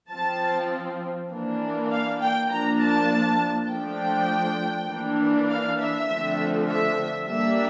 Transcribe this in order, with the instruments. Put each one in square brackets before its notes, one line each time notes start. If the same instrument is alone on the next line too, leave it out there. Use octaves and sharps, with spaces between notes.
[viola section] F3 C4 A5
E3 A#3 D4
F5
G5
F3 A#3 D4 A#5
A5
F3 A3 D4 G5
E3 A#3 D4
F5
E5
D3 F3 A3 C4
E5
G3 A#3 D4 E5